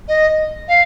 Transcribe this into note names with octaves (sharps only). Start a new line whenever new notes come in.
D#5
F5